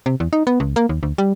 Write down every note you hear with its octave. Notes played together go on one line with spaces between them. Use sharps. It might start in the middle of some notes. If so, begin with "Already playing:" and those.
C3
E2
D#4
B3
C#2
A#3
D#2
D2
G3